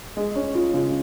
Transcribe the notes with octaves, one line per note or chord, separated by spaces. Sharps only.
G#3
C#4
F4
C#3